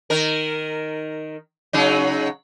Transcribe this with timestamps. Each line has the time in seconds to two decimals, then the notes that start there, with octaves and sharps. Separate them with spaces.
0.10 D#3 A#4
1.73 C#3 F#3 D#4